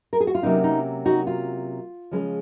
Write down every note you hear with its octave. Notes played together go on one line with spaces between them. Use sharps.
A#4
G#4
F#4
F4
C3 F#3 A#3 C#4 D#4
D#4
D#4 F#4
F4
C#3 F3 G#3 C#4